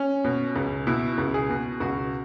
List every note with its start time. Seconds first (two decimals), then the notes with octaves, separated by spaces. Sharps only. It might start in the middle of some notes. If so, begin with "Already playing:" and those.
Already playing: C#4
0.24 B2
0.56 C#2
0.87 B2 E4
1.18 C#2
1.34 G#4
1.50 B2
1.80 C#2 F#4